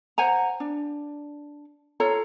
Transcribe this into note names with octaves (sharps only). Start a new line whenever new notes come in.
C5 F#5 G#5 A#5
D4
F4 A4 C#5 A#5